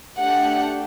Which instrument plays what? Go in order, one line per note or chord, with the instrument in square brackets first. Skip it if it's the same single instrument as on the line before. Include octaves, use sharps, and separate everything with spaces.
[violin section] A3 D4 G4 F#5